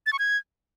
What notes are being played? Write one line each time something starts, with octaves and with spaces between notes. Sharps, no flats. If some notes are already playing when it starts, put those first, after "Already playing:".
A6
C#6
G#6